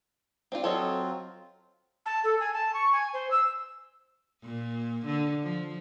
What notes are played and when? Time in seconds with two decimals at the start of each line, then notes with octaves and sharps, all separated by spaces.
0.52 C4 D4 F4
0.64 F#3 C4 F4 A4 C#5 D#5
2.06 A5
2.24 A4
2.40 G#5
2.54 A5
2.74 C#6
2.93 G#5
3.14 C5
3.31 E6
4.43 A#2
5.06 D3
5.43 F3